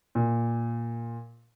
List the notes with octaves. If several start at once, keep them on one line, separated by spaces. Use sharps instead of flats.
A#2